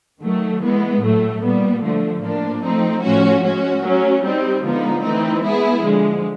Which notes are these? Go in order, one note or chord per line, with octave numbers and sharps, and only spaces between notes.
D#3 F#3 A3
E3 G#3 B3
A2 F#3 A3
A#2 G3 B3
D3 F3 A3
A2 F3 A#3 D4
F3 A3 C4 D#4
A2 F3 A3 C#4 F#4
G#3 C#4 F#4
F#3 A3 C#4
G3 C4 D#4
D3 F3 G#3 B3 D#4
E3 A3 C4 D#4
G#3 B3 E4 G#4
D3 F3 G#3